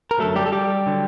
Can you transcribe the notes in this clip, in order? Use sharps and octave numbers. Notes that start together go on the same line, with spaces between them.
A#4
F#2 D3 F#3 A3 A4
G3 G4
A4
G3 G4
D3 F#3